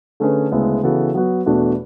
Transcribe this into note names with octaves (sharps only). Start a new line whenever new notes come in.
D3 A3 C#4 G#4 B4
D2 C#3 G#3 B3 E4
C#3 E3 B3 F#4 A4
F#3 B3 F#4
E2 B2 A3 D4 F#4